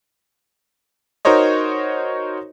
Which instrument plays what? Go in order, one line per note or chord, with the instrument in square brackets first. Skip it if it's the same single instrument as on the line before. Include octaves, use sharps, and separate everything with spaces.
[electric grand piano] D#4 F#4 A#4 C5 C#5 D#5